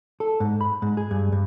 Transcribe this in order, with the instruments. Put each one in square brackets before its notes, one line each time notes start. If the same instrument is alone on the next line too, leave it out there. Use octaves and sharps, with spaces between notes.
[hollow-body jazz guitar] A4
G#2
B5
G#2
G#4
G2
G2